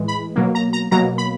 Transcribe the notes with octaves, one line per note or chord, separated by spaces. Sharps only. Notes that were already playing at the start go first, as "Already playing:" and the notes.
Already playing: A2 E3 G#3
B5
B2 F#3 A#3
A#5
A#5
B2 F#3 A#3 A#5
B5